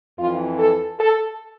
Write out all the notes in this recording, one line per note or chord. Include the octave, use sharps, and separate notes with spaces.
F2 E3 F4
A4
A4